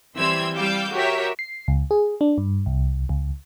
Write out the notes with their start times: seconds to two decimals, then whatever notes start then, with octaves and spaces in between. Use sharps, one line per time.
0.16 E3 G3 C4 C6 E6 G#6
0.55 G3 F5 D6 E6 G6
0.92 F#4 G4 A#4 C#5 E5
1.39 C7
1.68 C#2
1.91 G#4
2.21 D4
2.38 G2
2.66 C2
3.09 C#2